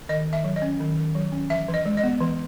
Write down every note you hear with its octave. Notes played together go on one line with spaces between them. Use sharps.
D#3 D#5
D#3
E5
F#3
D#5
C#4
D#3
D#3
F#3
C#4
E3 E5
E3
D#5
G#3
D#5
B3
E3